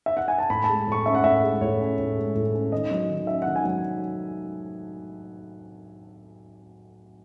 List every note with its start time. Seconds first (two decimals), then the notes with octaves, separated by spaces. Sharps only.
0.06 E5
0.17 F#5
0.28 G#5
0.38 A5
0.50 A2 B5
0.64 G#3 A5
0.87 A2 C#6
1.06 C#4 E5
1.15 F#5
1.24 A2 E5
1.43 G#3
1.61 A2 C#5
1.80 C#4
1.99 A2
2.17 G#3
2.35 A2
2.54 C#4
2.72 D#3 D#5
2.91 F#3
3.09 D#3
3.27 C#4 E5
3.42 D#3 F#5
3.56 G#5
3.65 F#3